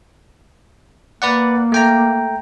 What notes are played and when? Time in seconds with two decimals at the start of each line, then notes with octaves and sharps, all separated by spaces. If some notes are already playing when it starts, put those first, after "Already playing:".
1.22 A#3 B4 D5 F#5
1.72 A3 G5 A#5